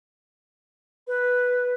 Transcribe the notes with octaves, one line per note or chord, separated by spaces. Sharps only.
B4